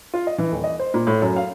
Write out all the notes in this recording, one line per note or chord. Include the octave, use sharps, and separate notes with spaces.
F4
D#5
E3
D#1
D#5
C5
A#2
A2
F#2
F5